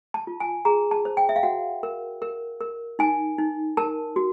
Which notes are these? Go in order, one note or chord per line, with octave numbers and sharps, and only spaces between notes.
A5
F4
G#5
G#4 A#5
A5
C5
G5
E5
F5
F#4 F#5
A#4
A#4
A#4
D#4 G#5
D#4
A#4 A5
F#4